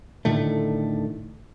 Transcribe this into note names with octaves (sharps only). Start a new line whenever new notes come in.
A2 D3 D#3 A3